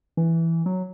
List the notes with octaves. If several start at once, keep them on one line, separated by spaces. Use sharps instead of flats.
E3
F#3